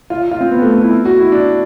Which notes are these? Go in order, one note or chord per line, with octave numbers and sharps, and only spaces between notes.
F4
F4
C4
B3
A3
B3
E4
F#4
E4
D4